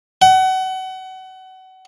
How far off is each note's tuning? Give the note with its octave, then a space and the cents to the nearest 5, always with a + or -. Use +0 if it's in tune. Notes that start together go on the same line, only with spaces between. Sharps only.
F#5 +30